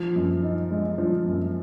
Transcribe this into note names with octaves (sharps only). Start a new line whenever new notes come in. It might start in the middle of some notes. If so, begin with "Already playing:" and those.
Already playing: F3
F#2
D#4
G#3
F3
F#2